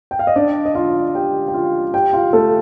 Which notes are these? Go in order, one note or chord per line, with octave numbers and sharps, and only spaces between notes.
G5
F5
D#5
D4 D5
D#5
F4 F5
G4 G5
G5
F4 F5
G4 G5
F4 F5
A3 A4